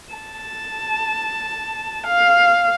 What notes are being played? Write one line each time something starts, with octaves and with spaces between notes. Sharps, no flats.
A5
F5